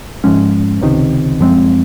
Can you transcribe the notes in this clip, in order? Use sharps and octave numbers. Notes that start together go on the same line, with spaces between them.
G#2 F3 G#3 C#4
C#2 C3 D#3
F#2 F3 G#3 C4